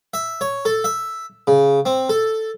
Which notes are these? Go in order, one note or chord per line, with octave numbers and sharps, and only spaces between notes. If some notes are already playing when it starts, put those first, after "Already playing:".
E5
C#5
A4
E5
C#3
C4
A4